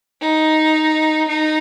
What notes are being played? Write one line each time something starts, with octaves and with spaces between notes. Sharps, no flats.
D#4
D#4